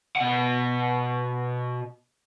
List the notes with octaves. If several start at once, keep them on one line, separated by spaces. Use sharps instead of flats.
B2 F#5